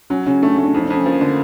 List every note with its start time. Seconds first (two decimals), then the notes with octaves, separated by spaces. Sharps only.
0.10 F#3 C#4
0.26 C#3 C#4
0.42 A3 D4
0.53 C#4
0.58 A3
0.63 D4
0.74 F2 D#4
0.85 D4
0.90 F2
0.96 C#4
1.06 F3 A#3
1.21 D3